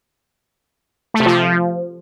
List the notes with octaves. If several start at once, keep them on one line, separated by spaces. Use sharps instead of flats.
A3
C3
F3